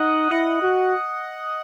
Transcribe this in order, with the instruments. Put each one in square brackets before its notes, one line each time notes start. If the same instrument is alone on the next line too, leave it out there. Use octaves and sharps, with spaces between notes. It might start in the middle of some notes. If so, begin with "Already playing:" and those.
Already playing: [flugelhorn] D#4 [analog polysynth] D#5 F#5
[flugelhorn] E4 [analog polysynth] D#5 F#5
[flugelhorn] F#4